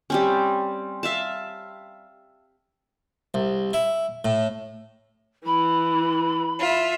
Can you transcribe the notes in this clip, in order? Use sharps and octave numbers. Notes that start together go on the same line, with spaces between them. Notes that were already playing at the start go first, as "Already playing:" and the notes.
G3 C4 C#4
E5 F5 A5
C2
E4
A2
E3 B5
F4 E5